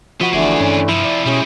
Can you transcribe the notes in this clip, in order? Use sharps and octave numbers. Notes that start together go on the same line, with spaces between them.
F3 F#4 B4 D#5
G1 D3 E3 A3 G#4 D5
G2 C#4
C3 F3 E4
D5
B2 G3 G#3 C#4 G#4